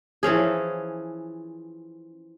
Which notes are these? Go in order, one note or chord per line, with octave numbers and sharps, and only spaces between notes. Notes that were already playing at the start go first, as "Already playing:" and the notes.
E3 F3 C#4 G#4